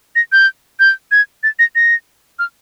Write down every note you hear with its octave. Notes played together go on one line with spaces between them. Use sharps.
A#6
G6
G6
G#6
A6
A#6
A#6
F6